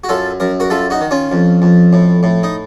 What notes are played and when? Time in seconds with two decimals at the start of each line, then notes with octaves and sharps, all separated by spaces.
0.04 F#4
0.09 F#2 F4 A4
0.40 F#2 A#4
0.60 F#4 A#4
0.70 F#2 F4 A4
0.90 D#4 F#4
1.01 D#3
1.11 C#4 F4
1.32 F2
1.62 F2
1.93 A2
2.23 A2
2.43 D#4